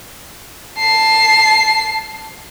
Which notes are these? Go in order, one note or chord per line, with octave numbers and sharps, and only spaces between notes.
A5 C7